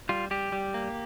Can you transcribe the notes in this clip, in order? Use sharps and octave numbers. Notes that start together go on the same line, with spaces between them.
G3 F4
G3 G4
G3
A#3